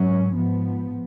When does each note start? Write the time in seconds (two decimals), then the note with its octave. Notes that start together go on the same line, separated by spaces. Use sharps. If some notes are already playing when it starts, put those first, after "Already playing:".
Already playing: G#2 F#3 C#4
0.34 G#2 F3 B3